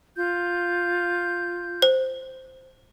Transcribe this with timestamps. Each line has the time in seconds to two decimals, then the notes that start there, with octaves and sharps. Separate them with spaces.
0.17 F4 G6
1.82 C5